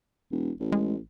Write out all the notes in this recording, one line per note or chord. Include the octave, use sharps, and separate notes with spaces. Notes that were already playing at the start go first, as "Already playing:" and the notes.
E1
A1
G#3